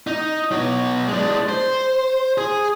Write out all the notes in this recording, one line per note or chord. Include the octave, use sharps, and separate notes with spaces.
D#4
B2 F#3
G#3 D4
C5
G#4